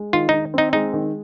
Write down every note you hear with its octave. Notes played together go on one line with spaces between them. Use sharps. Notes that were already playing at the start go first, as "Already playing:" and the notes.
Already playing: G#3
D#3 F4
D#3 D#4
C4 D#4
G#3 D#4
D#3